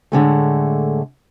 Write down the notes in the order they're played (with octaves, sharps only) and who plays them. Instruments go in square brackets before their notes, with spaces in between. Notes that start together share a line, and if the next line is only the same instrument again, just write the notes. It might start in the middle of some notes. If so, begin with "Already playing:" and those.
[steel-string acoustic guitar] A2 D3 G#3 A3